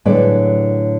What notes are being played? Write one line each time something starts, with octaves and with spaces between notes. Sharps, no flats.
A2 D3 F#3 G#4 B4 D5